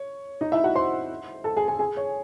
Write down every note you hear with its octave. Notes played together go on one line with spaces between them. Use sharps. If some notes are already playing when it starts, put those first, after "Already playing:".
Already playing: C#5
D#4 D#5
E4 E5
F#4 F#5
C5 C6
A4 A5
G#4 G#5
G#4 G#5
G#4 G#5
C#5